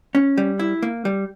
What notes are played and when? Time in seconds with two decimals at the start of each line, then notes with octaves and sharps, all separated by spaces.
0.15 C#4
0.37 G3
0.59 E4
0.82 A#3
1.05 G3